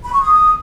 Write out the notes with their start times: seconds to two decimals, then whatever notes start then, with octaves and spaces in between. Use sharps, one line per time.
0.04 B5
0.13 C#6
0.22 D#6